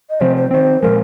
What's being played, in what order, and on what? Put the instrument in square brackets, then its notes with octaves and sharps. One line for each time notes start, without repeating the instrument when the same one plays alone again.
[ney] D#5
[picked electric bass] C3 F3 C4 [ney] C5
[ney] C5
[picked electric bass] D#3 C4 [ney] C5
[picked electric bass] A#2 F3 G#3 [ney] A#4